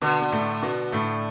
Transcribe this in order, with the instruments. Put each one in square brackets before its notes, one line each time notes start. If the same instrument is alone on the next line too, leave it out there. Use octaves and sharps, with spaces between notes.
[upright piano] B2 B3 [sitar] D3
[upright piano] B3
A2 A3
B2 B3
A2 A3